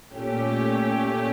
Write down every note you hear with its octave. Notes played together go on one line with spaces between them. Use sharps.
A#2 A3 C#4 G4